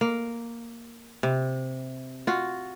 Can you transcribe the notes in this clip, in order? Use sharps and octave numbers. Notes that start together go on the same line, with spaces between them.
A#3
C3
F4 F#4